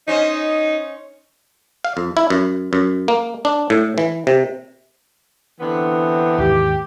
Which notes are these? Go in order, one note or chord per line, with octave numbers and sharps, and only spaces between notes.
C#4 D#4 C5 D#5
F5
F2
E4
F#2
F#2
A#3
D4
A2
E3
C3
D3 E3 B3 C4
D#2 G#2 G4